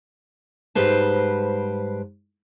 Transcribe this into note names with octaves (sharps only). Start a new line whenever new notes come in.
G#2 G3 B4 C5 A5